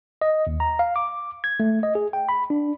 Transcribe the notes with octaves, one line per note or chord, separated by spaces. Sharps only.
D#5
D#2
A#5
F5
D6
G#6
A3
D#5
G#4
G5
B5
D4